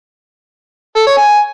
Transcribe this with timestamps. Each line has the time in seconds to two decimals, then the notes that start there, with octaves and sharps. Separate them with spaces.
0.96 A4
1.07 C#5
1.17 G#5